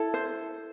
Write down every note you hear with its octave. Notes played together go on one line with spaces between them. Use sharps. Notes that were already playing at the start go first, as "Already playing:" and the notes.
Already playing: E4 A4
C5